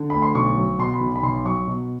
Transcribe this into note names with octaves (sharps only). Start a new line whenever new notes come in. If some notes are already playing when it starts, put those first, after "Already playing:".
Already playing: D3
D2 B5
C6
B1 C#6
F#3
B2 C6
B5
B1
B5
B1 C6
F#3 C#6
B2